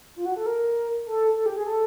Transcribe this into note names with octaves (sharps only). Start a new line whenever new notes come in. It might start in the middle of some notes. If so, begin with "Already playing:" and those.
F4
F#4
A4
A#4
A4
A4
G4
G#4
A4